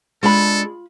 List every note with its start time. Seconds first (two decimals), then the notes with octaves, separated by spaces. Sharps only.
0.23 G#3 D4 F4 A4 B5